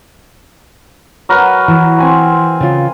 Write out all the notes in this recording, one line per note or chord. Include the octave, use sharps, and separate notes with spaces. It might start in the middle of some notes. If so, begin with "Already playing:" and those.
F#3 A#4 B4
E3
C4 G#5 C6
C#3 F4